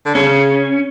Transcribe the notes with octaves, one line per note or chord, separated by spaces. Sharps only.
D3
C#3 C#4